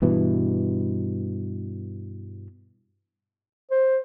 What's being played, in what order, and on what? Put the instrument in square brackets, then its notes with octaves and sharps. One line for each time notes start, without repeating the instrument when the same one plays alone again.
[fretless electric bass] G2 B2 E3
[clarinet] C5